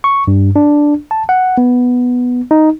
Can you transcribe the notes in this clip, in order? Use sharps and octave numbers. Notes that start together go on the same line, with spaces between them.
C#6
G2
D4
A5
F#5
B3
D#4